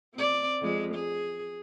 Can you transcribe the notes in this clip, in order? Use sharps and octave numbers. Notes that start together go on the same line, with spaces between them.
C4 D5
F2 G#3
G#4